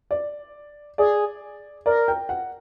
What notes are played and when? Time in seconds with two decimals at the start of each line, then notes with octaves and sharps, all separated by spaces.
0.11 D5
0.98 G#4 D5
1.86 A#4 D5
2.08 G5
2.29 F#5